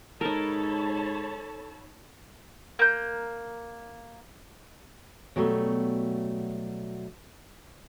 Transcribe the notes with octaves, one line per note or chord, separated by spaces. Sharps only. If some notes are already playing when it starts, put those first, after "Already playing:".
G#2 D#4 A4 A#4 C#5 A5 B5
A#3 G6
B2 F#3 G3 A3